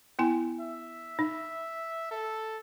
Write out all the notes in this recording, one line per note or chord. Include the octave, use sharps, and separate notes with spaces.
B3 E4 G#5
E5
D#4
A4